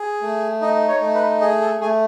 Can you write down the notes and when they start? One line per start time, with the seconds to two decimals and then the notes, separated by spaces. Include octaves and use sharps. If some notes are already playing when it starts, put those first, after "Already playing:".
Already playing: G#4
0.22 A3
0.61 D#4 D#5
0.88 C#5
1.01 A3
1.15 B4
1.41 G#4 D#5
1.61 A4
1.81 A3 G#4